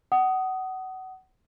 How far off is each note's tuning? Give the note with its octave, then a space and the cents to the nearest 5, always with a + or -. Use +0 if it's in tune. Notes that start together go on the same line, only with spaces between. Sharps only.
F#5 +25 D#6 +0